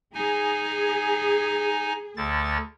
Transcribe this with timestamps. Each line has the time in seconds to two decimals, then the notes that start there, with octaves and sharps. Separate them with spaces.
0.14 D#4 G#4 G#5
2.17 D2 D3 A6